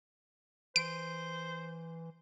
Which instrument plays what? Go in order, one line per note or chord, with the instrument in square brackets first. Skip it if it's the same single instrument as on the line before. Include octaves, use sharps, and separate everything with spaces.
[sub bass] E3 [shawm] C5 [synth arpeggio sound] D7